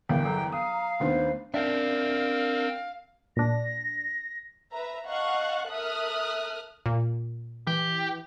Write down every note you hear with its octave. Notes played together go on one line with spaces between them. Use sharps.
G1 E2 A#4 F5 G5
F#3 A4 A#5
F5 D#6
D#2 A3 B3 D4 D#4 C5
C4 D4 A#4 E5 F5
A#2 D4 A#6
B4 E5 A#5
D#5 F5 F#5 A5 C#6 F#6
A4 A#4 E5 D#6 F6 F#6
A#2
E3 G4